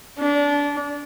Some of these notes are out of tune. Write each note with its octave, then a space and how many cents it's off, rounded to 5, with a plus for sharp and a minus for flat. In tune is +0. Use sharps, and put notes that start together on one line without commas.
D4 -25